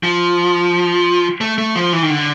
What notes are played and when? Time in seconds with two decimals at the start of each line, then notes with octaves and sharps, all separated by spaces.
0.03 F3
1.41 A3
1.58 A3
1.76 F3
1.93 E3
2.03 D#3
2.10 D3